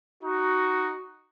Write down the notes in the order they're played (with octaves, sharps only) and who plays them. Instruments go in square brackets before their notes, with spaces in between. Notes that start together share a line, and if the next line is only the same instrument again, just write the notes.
[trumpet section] D#4 F#4